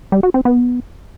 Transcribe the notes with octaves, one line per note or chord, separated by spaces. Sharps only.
G3
F#4
C4
B3